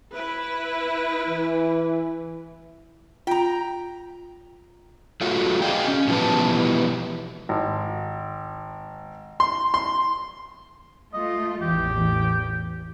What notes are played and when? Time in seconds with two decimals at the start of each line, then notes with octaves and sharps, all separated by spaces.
0.13 E4 B4
1.27 E3
3.27 F4 G5 A#5
5.21 F#3 A3 F4 F#4
5.62 F#4 G#4 D5 D#5 F5 G5
5.88 C#4
6.08 B2 E3 F3 G3 B4 A5
7.49 G#1
9.40 C6
9.74 C6
11.13 A3 F4 D#5
11.61 A1 E2 E3 G4